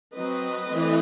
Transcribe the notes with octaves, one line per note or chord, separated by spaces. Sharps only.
F#3 C4 B4 D#5
E3 A3 C4